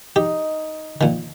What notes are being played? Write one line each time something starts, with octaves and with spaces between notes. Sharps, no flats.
D#4 G4
A#2 D#3